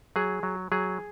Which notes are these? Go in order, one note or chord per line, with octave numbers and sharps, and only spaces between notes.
F#3 G#4
F#3
F#3 G#4